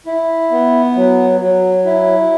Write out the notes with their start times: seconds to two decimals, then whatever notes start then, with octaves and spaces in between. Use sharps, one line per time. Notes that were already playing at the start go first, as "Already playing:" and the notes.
0.06 E4
0.51 B3
0.96 F#3
1.40 F#3
1.85 E4